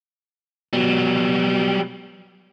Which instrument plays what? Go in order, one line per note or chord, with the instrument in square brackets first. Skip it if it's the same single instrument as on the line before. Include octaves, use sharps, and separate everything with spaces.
[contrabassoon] B2 [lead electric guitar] F#3 G3